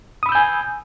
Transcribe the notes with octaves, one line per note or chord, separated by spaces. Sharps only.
G#5 B5 D#6 E6 G6